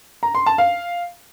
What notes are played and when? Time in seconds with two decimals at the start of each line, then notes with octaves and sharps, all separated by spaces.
0.23 A#5
0.35 C6
0.46 A5
0.58 F5